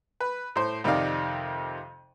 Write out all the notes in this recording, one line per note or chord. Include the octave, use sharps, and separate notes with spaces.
B4
A2 C5
F2 C3 D#3 D#4 D5 F5